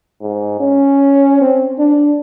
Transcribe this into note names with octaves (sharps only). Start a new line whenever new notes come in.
G#2
C#4
C4
D4